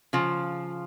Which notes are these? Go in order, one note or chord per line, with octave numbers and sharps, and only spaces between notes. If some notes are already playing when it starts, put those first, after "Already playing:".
C#3 F3